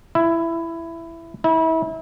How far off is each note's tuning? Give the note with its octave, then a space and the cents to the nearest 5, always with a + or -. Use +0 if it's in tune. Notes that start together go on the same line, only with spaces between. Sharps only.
E4 +15
E4 -30